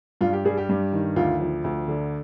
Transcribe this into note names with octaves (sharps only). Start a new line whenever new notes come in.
G2 F4
G4
G3 G#4
G4
G2
D#3
D2 F4
F3
D2
D3